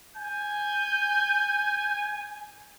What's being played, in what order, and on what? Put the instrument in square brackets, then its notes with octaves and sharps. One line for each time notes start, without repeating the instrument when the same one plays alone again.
[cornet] G#5 [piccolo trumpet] G6